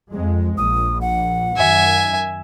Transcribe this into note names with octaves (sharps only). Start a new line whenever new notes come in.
F2 G#3
A#1 D#6
F#5
F#2 D#3 E5 G#5